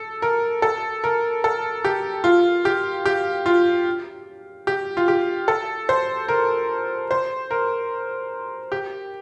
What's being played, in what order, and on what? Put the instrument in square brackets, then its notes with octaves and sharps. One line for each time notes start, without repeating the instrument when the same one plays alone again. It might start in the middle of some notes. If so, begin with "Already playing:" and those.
Already playing: [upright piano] A4
A#4
A4
A#4
A4
G4
F4
G4
G4
F4
G4
F4
G4
A4
C5
A#4
C5
A#4
G4